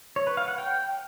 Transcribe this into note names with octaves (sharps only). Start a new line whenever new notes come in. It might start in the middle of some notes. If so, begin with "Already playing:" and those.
C#5
B4
F5
F#5
G5